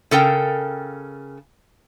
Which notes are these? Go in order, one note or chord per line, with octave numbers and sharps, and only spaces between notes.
C#3 A4 A#4 G5